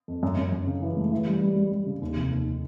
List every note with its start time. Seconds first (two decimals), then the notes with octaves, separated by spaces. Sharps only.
0.08 F2
0.23 F#2
0.37 F#2
0.52 F#2
0.67 C#3
0.82 E3
0.97 A3
1.12 E3
1.26 G3
1.41 G3
1.56 G3
1.72 G3
1.86 C#3
2.01 D#2
2.16 F1
2.31 D#2